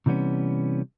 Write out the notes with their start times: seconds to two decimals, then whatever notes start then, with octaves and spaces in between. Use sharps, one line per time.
0.06 C3 E3 G3 B3 C#4